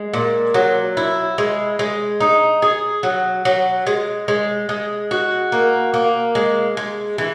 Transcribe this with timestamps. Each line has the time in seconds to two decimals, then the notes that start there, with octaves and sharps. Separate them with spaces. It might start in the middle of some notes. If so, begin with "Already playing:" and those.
Already playing: G#3
0.14 A#2
0.54 F#3
0.97 E4
1.38 G#3
1.79 G#3
2.20 D#4
2.62 G#4
3.03 F#3
3.45 F#3
3.87 G#3
4.28 G#3
4.69 G#3
5.11 F#4
5.52 A#3
5.94 A#3
6.35 G#3
6.77 G#3
7.18 E3